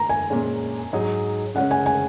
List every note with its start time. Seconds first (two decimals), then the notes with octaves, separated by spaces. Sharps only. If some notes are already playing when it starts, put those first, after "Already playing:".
Already playing: A#5
0.09 G#5
0.30 A#2 G#3 C#4
0.93 G#2 F#3 D#4 G#4
1.55 C#3 G#3 C#4 F#5
1.71 G#5
1.86 G#5